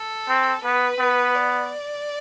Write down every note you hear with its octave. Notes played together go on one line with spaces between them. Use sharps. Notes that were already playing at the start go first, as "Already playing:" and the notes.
Already playing: A4
C4
B3 B4
B3
D5